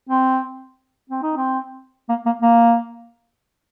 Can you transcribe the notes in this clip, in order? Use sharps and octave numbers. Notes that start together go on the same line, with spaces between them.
C4
C4
D#4
C4
A#3
A#3
A#3